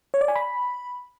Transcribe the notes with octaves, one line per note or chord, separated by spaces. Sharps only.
C#5
D5
G#5
B5